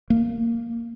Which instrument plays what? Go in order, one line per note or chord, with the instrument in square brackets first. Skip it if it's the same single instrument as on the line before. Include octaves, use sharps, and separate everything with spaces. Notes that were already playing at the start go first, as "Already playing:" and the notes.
[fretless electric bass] A#3